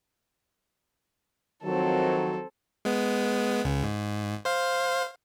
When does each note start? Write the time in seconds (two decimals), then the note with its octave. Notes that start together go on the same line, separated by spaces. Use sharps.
1.64 D#3 F3 F#3 C4 A4
2.85 G#3 B3
3.65 C#2 C#3
3.84 G#2
4.45 C5 F5